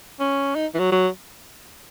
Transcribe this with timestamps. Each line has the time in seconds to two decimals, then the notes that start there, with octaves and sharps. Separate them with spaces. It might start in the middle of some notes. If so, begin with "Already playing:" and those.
0.20 C#4
0.55 D#4
0.74 E3
0.79 F#3
0.91 F#3